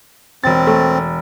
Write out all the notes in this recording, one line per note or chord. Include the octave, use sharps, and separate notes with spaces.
E1 C4 A6
A3